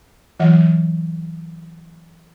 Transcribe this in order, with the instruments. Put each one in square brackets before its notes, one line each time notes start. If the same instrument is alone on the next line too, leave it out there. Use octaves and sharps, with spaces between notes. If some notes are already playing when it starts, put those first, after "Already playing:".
[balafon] E3 F#3 F#5